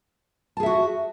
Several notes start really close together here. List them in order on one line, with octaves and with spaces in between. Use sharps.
A5 G#4 E5 F#4